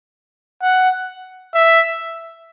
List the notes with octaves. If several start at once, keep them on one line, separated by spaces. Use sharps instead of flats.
F#5
E5